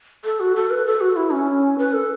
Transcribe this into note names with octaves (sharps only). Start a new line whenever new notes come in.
A4
F#4
A4
B4
A4
F#4
E4
C#4
B4
A4